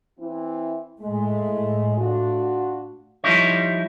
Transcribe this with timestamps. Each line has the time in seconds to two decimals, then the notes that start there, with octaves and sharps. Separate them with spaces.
0.19 E3 C4 E4
1.00 A2 G#3 A3
1.97 D4 F4 F#4
3.24 F3 G3 D#4 E4 C#5